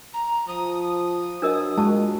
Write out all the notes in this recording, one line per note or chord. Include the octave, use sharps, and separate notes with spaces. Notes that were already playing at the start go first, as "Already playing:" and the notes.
A#5
F3 D#6
F#3 D4 A#4 D#5
A#2 G#3 F#4 A5